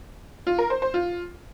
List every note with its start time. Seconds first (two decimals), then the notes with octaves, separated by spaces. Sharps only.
0.47 F4
0.58 A#4
0.70 C5
0.82 C5
0.94 F4